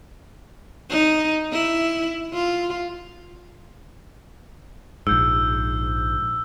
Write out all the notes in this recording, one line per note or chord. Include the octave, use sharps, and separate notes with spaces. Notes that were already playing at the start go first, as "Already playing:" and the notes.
D#4
E4
F4
A#1 G#2 E6 G6